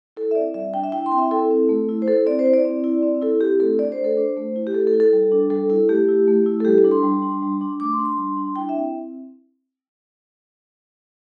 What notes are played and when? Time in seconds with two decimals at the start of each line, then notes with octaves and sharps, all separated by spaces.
0.17 E4 A4
0.31 E5
0.35 C4 D5
0.54 G3 E5
0.74 D4 G5
0.84 E5
0.92 E4 G5
1.06 C6
1.12 C4 G5
1.18 E5
1.31 E4 A4
1.50 C4
1.69 A3
1.89 E4
2.02 C5
2.07 E4 A4
2.26 C4 D5
2.39 C5
2.46 E4
2.53 D5
2.65 C4
2.84 E4
3.03 C4
3.21 E4 A4
3.40 C4 G4
3.60 A3 A4
3.79 D4 D5
3.92 C5
3.99 A3
4.04 A4
4.17 D4 C5
4.37 A3
4.56 E4
4.67 G4
4.74 A3 A4
4.87 A4
4.94 E4
5.00 A4
5.13 G3
5.32 D4
5.50 G3 A4
5.70 E4 A4
5.89 A3 G4
6.09 E4
6.28 A3
6.46 E4
6.60 A4
6.65 G3 G4
6.78 A4
6.85 D4
6.91 C6
7.03 G3
7.22 D4
7.42 G3
7.61 D4
7.80 A3 D6
7.93 C6
7.99 D4
8.05 C6
8.17 G3
8.37 D4
8.56 E4 G5
8.69 E5
8.75 C4